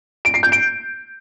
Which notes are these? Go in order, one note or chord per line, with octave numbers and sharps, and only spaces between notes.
D7
C7
G6
D7